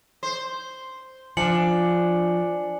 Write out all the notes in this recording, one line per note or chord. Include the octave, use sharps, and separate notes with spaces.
C5
F3 D4 G#5 C#7 F#7